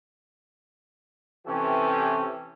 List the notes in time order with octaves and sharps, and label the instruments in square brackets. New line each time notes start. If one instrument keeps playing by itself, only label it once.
[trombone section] C3 E3 C#4 G4 A4